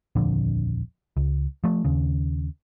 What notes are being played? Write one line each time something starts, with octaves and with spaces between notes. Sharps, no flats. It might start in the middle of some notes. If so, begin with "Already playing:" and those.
D#1 A#1 F2 D3
C#2
F3 A3
D#2 C#3